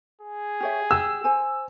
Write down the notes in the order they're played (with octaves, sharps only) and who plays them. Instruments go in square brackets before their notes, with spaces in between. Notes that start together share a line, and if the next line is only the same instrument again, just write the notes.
[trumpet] G#4
[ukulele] G4 C#5 E5
[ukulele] G4 [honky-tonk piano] E6
[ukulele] C5 G#5